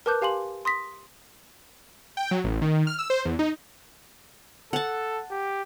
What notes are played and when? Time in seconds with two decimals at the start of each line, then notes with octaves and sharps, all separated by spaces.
0.06 A#4 B4 A5 D6 F#6 G6
0.22 G4 F5 G#5 C6 F#7
0.65 C6 D#6 A#6 B6
2.17 G5
2.31 F#3
2.44 A1
2.62 D#3
2.87 F6
2.99 E6
3.10 C5
3.25 E2
3.39 D#4
4.73 A4 F#5 A5
5.31 G4